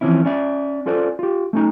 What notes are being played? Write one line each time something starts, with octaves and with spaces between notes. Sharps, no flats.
E3 F3 C4 C#4 E4
C#4 D5 E5
C#4 F4 A4 C5 D5
F4 G4
A3 C#4 D#4